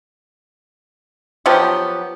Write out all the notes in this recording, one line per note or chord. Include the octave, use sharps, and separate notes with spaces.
F3 F#3 B3 G4